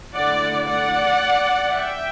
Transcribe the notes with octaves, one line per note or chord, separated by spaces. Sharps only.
D3 A3 E4 D5 F#5
D5 F#5
E5 G5